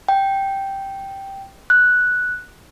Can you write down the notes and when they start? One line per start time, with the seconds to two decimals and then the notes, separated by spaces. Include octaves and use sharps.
0.09 G5
1.70 F#6